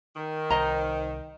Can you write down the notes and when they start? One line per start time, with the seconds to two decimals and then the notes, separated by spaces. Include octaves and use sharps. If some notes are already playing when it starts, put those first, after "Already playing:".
0.16 D#3
0.50 C2 C5 D#5 A#5